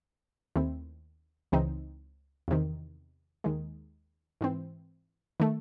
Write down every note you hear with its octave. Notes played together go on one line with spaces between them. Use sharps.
D#2 D#3 A3 C4 E4
C#2 C#3 E3 C4 D#4
E2 C3 D#3
D#2 D#3 G#3
G#2 E3 C4
D#3 A3